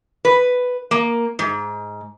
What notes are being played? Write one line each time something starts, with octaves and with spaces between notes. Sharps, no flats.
B4
A#3
G#2